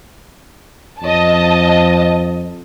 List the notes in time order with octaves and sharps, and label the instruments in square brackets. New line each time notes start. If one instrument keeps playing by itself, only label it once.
[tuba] F2 [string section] D#5 A5